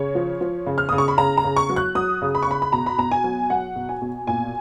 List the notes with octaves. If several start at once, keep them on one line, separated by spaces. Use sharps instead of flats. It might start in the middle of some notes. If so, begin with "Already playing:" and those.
Already playing: C#3 C#5
F3
F3
C#3
F6
C#3 D#6
C#6
B5
C#3 A#5
A#5
C#3
C#6
F#3
F#6
F#3 D#6
C#3
B5
C#6
C#3 B5
B5
B2 A#5
B5
B2 A#5
G#5
F#3
F#3 F#5
B2
G#5
B2
A#2 G#5